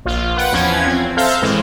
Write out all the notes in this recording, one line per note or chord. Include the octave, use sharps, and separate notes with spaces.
A#1 F4
B4 F#5 G5
E2 F3 C#4 B4 G#6
C4
A4 C5 E5 F5 A#5 G6
A2 E3 G#3 C4